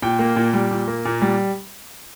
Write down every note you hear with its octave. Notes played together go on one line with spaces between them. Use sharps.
A#2 G5
A#3
A#2
G3
A#2
A#3
A#2
G3